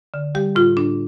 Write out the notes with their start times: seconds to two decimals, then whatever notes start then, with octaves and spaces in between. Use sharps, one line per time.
0.14 D3
0.35 G3 G4
0.56 A2 F4
0.77 A2 D4